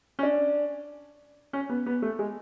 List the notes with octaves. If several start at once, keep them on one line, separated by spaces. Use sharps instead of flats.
C#4
D4
C#4
B3
B3
A3
G#3